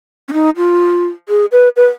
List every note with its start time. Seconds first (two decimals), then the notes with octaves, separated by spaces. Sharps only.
0.28 C#4
0.33 D#4
0.57 F4
1.29 G#4
1.52 B4
1.76 B4